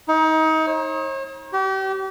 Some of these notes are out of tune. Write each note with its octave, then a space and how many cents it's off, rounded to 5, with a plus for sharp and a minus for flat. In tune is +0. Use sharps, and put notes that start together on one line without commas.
D#4 +30
C#5 -45
G4 -35